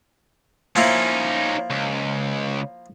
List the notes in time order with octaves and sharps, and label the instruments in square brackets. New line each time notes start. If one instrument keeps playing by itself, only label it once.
[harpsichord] F3 A#3 E4 [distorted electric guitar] C#4 D#4
[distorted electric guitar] C#2